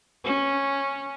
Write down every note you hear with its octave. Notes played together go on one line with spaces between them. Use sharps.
C#4